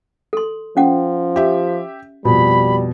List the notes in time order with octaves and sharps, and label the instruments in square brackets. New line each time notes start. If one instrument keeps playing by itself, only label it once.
[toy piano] A4 C6
[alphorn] F3 [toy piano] C#4 F#5
[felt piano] G4 E5
[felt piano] F2 B2 [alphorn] G3 [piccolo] B5